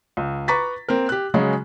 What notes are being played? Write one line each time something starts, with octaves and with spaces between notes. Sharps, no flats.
C#2
B4 A#5 C#6 D6 A6 B6
A#3 C4 A#4
G4 F#6
C#3 F#3 G#3 F#4